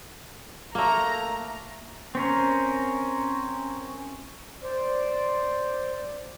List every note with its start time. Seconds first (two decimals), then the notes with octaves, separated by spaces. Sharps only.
0.75 A3 A#3 A#5
2.15 C4 C#4 A#4
4.63 C5 D5